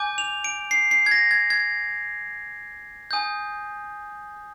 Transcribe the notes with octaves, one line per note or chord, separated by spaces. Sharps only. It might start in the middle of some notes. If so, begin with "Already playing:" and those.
Already playing: G#5 D6 G6
F7
D7
C7
C7
G#6
A#6
G#6
G#6
G#5 D#6 G6